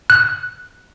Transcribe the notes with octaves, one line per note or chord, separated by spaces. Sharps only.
F#6